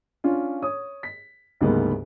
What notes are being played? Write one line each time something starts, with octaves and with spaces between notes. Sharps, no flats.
C#4 D4 F4
C#5 D#6
B6
D2 G#2 C#3 G3 A#3 B3